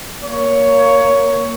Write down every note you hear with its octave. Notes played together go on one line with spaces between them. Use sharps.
A#3 C#5